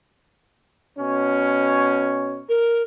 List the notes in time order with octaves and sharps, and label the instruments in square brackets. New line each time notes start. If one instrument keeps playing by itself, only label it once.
[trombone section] B2 C#4
[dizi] A#4